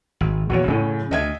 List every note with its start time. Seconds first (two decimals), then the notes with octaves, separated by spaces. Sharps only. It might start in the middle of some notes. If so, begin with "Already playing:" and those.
0.21 G#1
0.50 A#1 E2 A#2 F#4 C#5
0.68 F#2 A2 C#3 C#4
1.11 D2 D#5 E5 G#6